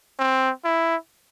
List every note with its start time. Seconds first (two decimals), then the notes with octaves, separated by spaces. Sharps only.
0.19 C4
0.64 E4